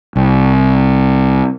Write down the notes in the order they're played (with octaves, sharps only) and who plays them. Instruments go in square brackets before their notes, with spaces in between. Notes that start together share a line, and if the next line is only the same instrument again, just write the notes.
[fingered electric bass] C2